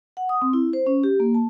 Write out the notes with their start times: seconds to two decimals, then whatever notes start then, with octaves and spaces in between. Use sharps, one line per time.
0.17 F#5
0.29 D#6
0.42 C4
0.53 E4
0.73 C5
0.86 C#4
1.03 G4
1.20 A#3
1.34 A5